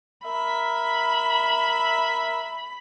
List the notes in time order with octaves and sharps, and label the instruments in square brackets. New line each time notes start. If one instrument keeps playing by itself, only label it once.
[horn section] A#4 E5 [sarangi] B5